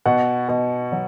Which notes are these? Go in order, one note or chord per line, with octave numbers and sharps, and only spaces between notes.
B2 F#5
B2
F#3